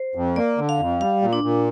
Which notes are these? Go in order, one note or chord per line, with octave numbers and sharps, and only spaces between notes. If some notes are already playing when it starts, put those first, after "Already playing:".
Already playing: C5
F2
A#3 D5
D3
F5
F2
G3 F5
A#2
D4
A#2